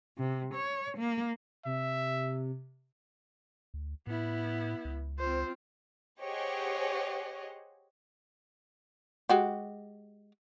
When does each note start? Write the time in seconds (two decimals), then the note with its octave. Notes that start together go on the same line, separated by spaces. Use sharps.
0.18 C3
0.54 C#5
0.98 A#3
1.65 C3 E5
3.74 D2
4.07 A2 B3 E4
4.85 C#2
5.19 C4 F4 C5
6.22 G4 G#4 C5 C#5 D#5 F#5
9.29 G#3 F#4 G4